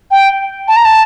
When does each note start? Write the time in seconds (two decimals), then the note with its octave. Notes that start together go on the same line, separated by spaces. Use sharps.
0.11 G5
0.68 A5
0.76 A#5
0.85 A5